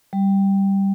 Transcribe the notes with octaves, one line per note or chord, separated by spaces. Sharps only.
G3